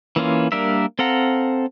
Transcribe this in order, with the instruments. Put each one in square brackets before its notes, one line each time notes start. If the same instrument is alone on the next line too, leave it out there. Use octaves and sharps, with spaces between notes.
[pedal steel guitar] E3 A#3 C#4 F4
G3 A#3 D4 A#4 E5
C4 A4 F5 F#5 A#5